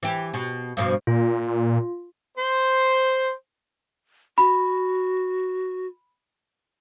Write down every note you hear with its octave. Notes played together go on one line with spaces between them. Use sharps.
E3 G4
B2
G2 B2 F3
A#2 F4
C5
F#4 B5